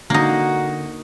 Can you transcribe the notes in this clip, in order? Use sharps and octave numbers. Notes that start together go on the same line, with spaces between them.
D3 A#3 D#4 F#4